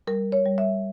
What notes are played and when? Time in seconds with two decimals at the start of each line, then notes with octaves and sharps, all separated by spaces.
0.07 G3 A#4
0.32 C#5
0.46 G3
0.58 E5